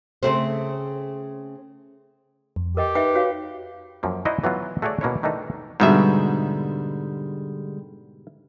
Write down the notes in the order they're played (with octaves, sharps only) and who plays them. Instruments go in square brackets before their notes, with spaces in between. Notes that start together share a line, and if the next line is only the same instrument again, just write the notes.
[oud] C#3 A3 C4
[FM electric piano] F2
[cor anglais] G4 [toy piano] A#4 D#5 G5
[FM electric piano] D#4 [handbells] B4 [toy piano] E5 G5
[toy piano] F#4 C#5 F5
[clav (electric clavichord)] F#2 F3 A#3
D#4 E4 F#4 C5 D5 D#5
E3 F#3 B3 F4
A3 F#4 G#4 C#5 D5
B2 A#3 C#4 E4 C#5
D#3 E3 A3 D4 D#4
[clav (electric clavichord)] G#2 B2 E5 [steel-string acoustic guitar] D3 G3 G#3